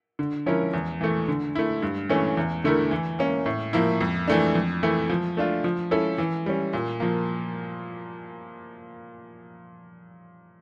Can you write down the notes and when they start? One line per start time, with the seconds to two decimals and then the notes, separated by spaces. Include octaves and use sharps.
0.19 D3
0.46 F3 C#4 E4 A#4
0.73 E2
1.01 E3 A3
1.28 D3
1.55 A3 E4
1.82 G2
2.09 E3 A3 C#4
2.37 E2
2.64 D3 A3 E4 A#4
2.91 E3
3.19 A#3 C#4
3.46 A2
3.73 F3 A#3 E4
4.01 F2
4.28 E3 A3 D4
4.55 F2
4.83 E3 A3 E4
5.09 F3
5.37 A3 D4 F4
5.64 F3
5.91 C#4 E4 A4
6.18 E3
6.46 G3 C#4
6.73 A#2
7.00 F3 A#3